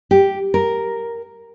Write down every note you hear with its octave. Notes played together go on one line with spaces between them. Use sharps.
G4
A#4